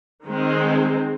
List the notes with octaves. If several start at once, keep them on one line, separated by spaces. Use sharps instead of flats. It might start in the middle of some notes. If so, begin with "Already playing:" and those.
D#3 G#3 C4